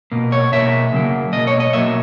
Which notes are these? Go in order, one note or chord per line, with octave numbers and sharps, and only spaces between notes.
B2 A#3
C#5
B2 A#3 E5
C#3 F#3 A#3
B2 A#3 D#5
C#5
D#5
B2 F#3 A#3 E5